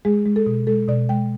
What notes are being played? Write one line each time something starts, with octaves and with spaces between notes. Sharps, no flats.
G#3 G#4
G#3
A4
B2
G#3 A4
B2 D5
G#3 G5